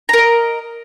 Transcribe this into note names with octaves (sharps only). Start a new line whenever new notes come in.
A#4 D#5 A#5